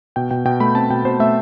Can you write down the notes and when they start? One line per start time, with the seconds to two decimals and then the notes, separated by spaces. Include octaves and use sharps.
0.16 B2 G5
0.31 B2 G5
0.45 B2 G5
0.60 A3 B5
0.75 C4 A5
0.90 B2 G5
1.05 B2 C5
1.20 A3 E5